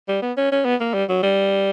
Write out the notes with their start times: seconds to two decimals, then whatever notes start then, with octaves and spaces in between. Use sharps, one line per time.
0.08 G3
0.22 B3
0.37 C#4
0.52 C#4
0.65 B3
0.80 A#3
0.94 G3
1.09 F#3
1.23 G3